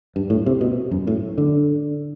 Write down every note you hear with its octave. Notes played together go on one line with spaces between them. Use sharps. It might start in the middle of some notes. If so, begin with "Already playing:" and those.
G2
A2
C3
B2
F#2
A2
D3